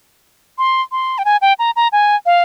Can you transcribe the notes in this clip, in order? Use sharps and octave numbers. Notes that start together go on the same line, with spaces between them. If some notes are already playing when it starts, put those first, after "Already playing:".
C6
C6
G5
G#5
G5
A#5
A#5
G#5
F5